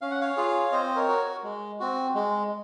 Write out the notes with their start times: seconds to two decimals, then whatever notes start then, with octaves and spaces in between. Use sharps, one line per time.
0.01 C#4 F5
0.11 F#5
0.21 C#5 F5
0.37 F4 G#4
0.72 C4 C5 D#5
0.96 A#4 C#5
1.08 F#4
1.43 G#3
1.80 C4 F#4
2.15 G#3